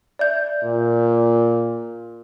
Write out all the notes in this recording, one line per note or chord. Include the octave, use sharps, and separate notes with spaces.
D5 E5 G6
A#2